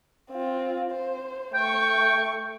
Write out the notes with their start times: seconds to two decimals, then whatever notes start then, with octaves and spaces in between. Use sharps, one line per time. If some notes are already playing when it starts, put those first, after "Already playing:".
0.30 C4 F4
0.91 C5
1.54 A3 G5 C#6